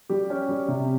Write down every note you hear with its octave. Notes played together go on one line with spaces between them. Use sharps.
G3 G4
C#4
G3
C3